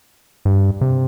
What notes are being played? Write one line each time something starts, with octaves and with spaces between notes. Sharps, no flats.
G2
C3